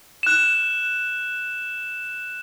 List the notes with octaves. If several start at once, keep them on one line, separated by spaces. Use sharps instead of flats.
F#6 E7